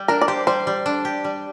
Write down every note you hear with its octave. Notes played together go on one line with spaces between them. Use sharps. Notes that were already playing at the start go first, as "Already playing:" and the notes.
Already playing: G3
D4 A#4
D5
G4 C5
G3 C5
G3
D4
G4
G3